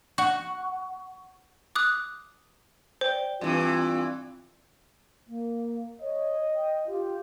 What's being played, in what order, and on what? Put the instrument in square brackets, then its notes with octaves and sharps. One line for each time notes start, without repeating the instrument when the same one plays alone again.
[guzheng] F#4
[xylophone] D6 D#6 F#6
[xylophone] C5 [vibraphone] D5 G5
[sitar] G2 E3 [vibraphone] C4 [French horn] F4
[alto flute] A#3
[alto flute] C#5 [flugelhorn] D#5
[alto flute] G5
[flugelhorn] F4 [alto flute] G4